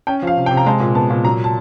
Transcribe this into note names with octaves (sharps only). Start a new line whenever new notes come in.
C#4 G5
F3 F5
C3
G5
C3
A#5
G#3 A5
A#2
B3 A5
A#2
F#3 A#5
A5